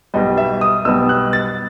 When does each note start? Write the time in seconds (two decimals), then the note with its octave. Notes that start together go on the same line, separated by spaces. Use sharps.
0.14 B1 B2 G3 D#5
0.37 E5
0.61 D#6
0.85 B1 B2 G3 E6
1.09 F#6
1.33 A6